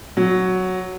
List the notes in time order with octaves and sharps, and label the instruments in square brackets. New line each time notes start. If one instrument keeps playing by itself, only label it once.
[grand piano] F#3